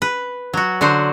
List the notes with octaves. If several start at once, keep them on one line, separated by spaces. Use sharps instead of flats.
B4
F#3 F#4
D3 F#3 F#4 C5